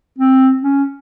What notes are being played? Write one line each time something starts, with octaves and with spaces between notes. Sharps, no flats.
C4
C#4